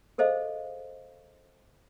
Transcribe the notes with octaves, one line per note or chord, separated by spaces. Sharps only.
G#4 A4 C5 D#5 F5